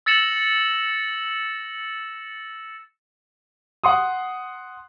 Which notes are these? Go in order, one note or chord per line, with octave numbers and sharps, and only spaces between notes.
E6 A6 A#6 C#7 E7 F#7
F#5 C6 D#6